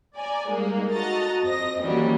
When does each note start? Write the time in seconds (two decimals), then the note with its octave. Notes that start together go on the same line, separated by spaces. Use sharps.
0.17 D5 G#5 A#5
0.50 G3 G#3 A#3 D#4
0.92 F#4 A4 D#5 A#5 A6
1.43 F2 C4 D#5 A#6
1.83 D#3 E3 F#3 G3 A#3 C#4